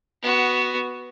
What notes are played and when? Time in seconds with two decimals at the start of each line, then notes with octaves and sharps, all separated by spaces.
0.22 B3 F#4